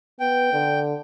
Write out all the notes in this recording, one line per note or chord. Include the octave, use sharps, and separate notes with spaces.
B3 G5
D3